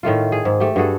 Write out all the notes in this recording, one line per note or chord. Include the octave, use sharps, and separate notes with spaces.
A2 D#3 A3 F4
G#4
G#2
A3 G4
G2 F#4 G#4 A4